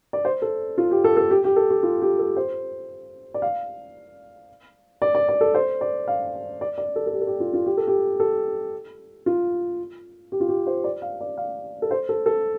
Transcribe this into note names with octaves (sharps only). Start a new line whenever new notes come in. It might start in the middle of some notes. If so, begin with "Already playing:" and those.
D5
C5
A4
F4
G4
A4
A4
G4
G4
A4
G4
F4
G4
A4
C5
D5
F5
D5
D5
D5
A4
C5
D5
F5
D5
D5
A4
A4
G4
A4
G4
F4
F4
G4
A4
G4
A4
F4
G4
F4
G4
C5
D5
F5
D5
F5
A4
C5
A4
A4